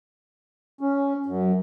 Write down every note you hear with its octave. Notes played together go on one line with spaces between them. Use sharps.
C#4
F#2